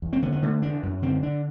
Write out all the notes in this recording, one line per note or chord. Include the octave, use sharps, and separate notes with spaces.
E2
C4
D3 B3
B3
D3 A3
E2 D4
F#2
D3 C4
D3 D4